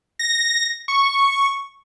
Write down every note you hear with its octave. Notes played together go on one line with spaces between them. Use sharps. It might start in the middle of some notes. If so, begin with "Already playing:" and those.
A#6
C#6